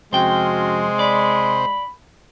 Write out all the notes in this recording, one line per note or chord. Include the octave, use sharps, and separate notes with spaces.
F2 C3 G#3 C#4 F#4 C5 G5
D5 B5